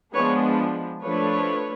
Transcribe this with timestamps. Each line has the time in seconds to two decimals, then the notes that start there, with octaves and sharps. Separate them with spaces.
0.13 F3 G#3 B3 D4 B4 C#5
1.02 F3 A3 D4 B4 C#5